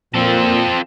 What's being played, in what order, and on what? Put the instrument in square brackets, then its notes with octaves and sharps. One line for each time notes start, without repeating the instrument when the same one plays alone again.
[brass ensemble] A#2 [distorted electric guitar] F3 A4 [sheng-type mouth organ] C4